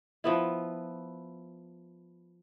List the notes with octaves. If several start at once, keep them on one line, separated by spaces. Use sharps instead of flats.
F3 B3 E4